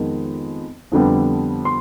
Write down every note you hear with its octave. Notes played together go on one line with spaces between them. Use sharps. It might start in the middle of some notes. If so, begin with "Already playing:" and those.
Already playing: F2 D#3 G#3 B3
F2 D3 G3 B3
C6